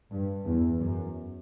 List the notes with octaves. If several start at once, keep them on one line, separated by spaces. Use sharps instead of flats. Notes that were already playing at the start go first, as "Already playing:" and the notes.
G2
E2
F#2